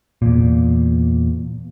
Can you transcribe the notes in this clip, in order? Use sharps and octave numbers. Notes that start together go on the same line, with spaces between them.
E2 A#2